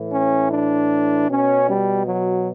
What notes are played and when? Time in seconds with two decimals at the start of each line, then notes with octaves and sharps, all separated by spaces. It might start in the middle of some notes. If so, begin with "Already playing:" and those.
Already playing: A2 E3
0.12 C#4
0.52 D4
1.29 B2 C#4
1.68 G3
2.06 F#3